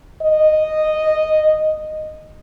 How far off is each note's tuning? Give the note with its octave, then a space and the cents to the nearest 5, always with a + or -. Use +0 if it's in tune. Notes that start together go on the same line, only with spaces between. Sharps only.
D#5 -10